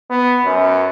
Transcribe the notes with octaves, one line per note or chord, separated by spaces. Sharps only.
B3
F#2